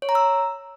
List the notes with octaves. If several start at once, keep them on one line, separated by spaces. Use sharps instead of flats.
C#5
A#5
E6